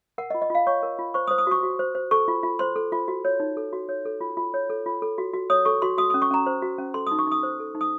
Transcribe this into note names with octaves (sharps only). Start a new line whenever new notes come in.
A#4 F#5
D#5
F4
D#5
F4 F5
C#5 C#6
A#4
F4
C5 C#6
D#6
C5
D#6
F#4 C#6
F#4
C5
C5
A4 C#6
F4
F4
C5 C6
A4
F4
F#4
C#5
D#4
A4
F#4
C#5
A4
F4
F4
C#5
A4
F4
A4
F#4
F#4
C#5 D#6
A4 C#6
F#4 C6
F#4 D#6
C#4 D#6
C#6
C#4 A#5
C5
F#4
C#4
A4 C6
D#4 D#6
C#6
D#4 D#6
C5
A4
D#4
D#6